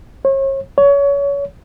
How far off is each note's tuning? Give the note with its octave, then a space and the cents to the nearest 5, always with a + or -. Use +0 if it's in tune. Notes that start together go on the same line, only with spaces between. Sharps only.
C#5 -40
C#5 +25